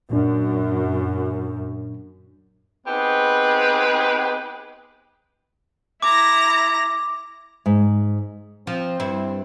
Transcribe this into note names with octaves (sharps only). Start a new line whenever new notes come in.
F#2 A#2 D4
B3 C4 D#4 G4 G#4 B4
E4 A#5 D6 A#6
G#2
F3 C4
G2 E4